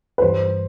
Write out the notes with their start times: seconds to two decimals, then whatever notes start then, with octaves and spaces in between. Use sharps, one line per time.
0.18 B4
0.22 G2 E3 G3 C5